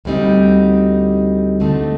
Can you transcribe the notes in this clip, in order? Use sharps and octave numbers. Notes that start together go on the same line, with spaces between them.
D2 D3 G3 C4 D#4
D3 A3 C4 D#4